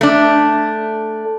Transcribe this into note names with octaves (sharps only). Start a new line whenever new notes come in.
A3 D4